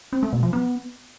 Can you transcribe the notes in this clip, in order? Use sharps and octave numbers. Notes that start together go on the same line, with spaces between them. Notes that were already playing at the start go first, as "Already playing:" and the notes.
C4
A3
B2
F3
B3